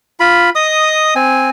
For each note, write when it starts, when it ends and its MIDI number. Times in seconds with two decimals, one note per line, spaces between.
0.20 0.50 65
0.20 0.50 83
0.55 1.14 75
0.55 1.14 87
1.16 1.50 60
1.16 1.50 80